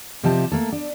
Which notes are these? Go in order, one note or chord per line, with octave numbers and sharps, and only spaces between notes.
C3 F3 G4 D#5 E5 A5
A3 A#3 A4
D4